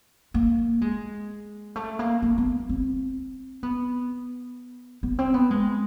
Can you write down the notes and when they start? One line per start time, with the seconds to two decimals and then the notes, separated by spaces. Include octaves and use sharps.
0.34 A#3
0.81 G#3
1.76 A3
1.99 A#3
2.22 A#3
2.38 B3
2.69 C4
3.63 B3
5.03 B3
5.19 C4
5.34 B3
5.51 G#3